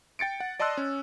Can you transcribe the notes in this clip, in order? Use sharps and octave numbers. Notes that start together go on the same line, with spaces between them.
G5 A6 C#7 D7
F#5
D5 D#5 A5 C6 E6 F#6
C#4